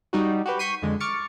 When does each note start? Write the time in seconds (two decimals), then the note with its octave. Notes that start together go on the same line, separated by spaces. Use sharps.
0.13 G3 D#4 F#4
0.46 F#4 G4 B4
0.59 C#6 G6 B6 C7 D#7
0.82 F2 D3 G#3
1.00 C#6 D6 F6 A6 C#7